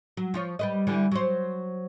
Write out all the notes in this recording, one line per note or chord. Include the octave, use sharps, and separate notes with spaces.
F#3
F3 F4 C#5
G3 B4 D#5
D3 E3 G3
F#3 C5